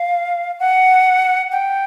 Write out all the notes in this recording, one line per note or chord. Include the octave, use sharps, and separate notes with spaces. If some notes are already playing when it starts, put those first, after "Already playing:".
Already playing: F5
F#5
G5